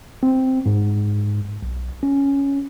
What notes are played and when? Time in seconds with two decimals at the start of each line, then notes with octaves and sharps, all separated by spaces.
0.23 C4
0.66 G#2
1.62 B1
2.03 C#4